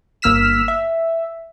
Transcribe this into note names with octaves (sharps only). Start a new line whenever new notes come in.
G1 A#3 E6 F6 B6 E7
E5